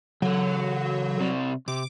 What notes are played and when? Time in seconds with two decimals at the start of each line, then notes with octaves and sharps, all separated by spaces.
0.22 C#3 F#3 A4
1.20 C3 C4 D5
1.68 C3 D6